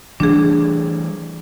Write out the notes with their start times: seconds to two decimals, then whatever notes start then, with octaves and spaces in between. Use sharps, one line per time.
0.20 E3 G3 A3 D4 G#4